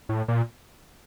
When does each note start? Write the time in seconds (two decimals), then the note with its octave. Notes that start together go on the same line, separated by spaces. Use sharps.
0.09 A2
0.28 A#2